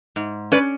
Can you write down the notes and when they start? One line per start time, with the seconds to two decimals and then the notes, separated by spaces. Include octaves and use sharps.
0.16 G#2
0.52 C#4 B4 D5